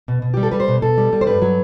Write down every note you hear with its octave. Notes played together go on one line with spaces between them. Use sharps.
B2
B2
G3 G4
A4
G3 B4
C5
B2
B2 A4
G3
G3
C5
G2 B4
F#3